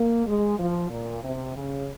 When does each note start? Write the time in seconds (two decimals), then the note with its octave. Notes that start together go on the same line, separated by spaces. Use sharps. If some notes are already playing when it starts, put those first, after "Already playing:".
Already playing: A#3
0.27 G#3
0.58 F3
0.90 A#2
1.23 C3
1.55 C#3